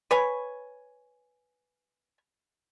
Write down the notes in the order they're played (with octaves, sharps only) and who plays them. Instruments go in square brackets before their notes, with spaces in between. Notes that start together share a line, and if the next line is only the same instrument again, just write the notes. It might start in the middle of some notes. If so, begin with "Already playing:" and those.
[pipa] B4 C#5 G#5